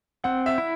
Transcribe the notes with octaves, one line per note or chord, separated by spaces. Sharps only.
C4 F#5
E5
E4